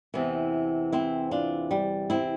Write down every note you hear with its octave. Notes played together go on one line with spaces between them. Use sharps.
E2 C3 E3
C4 E4
D4 F4
G3
C4 E4